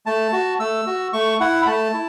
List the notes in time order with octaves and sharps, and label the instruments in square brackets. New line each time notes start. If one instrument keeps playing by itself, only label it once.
[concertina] A3 A5
F#4
A3 E6
F#4
A3 C#6
E4 F#5
B5
A3 A5
E4